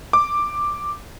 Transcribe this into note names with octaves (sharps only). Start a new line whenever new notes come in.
D6